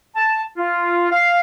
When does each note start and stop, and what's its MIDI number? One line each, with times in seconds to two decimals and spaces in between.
0.15 0.42 81
0.57 1.10 65
1.12 1.41 77